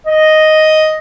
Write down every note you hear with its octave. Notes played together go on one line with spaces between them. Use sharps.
D#5